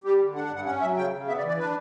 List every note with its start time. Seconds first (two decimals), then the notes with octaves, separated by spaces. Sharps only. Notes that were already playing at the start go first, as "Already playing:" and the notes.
0.04 G3 G4
0.20 D3
0.35 D4 F#5
0.45 F#5
0.50 G2
0.56 F#5
0.66 C#4 F#5
0.81 F#3 E5
0.97 C#3 G5
1.12 C#3
1.27 B3 E5
1.38 D5
1.43 E3
1.48 D5
1.58 D4 B4